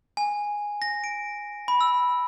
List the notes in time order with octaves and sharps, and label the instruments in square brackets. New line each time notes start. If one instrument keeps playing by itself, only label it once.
[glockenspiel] G#5
A#6
D7
B5
E6